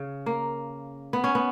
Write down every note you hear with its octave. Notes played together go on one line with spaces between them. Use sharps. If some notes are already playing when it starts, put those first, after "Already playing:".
Already playing: C#3
A#3
B3
C#4
B3